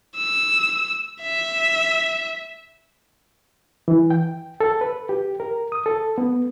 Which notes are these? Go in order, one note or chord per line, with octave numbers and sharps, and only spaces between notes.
E6
E5
E3
G5
A4
B4
G4
A#4
D#6
A4
B3